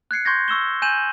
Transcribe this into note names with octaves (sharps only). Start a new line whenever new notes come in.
F#6 G#6 C7 C#7
C6 C#6 G6 G#6 A#6
C#6 E6 E7 G7
G#5 G6 D#7 E7 F#7